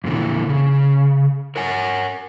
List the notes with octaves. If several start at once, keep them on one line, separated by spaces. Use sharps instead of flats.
F2 A#2 D3 E3
C#3
A#4 C#5 F#5 G#5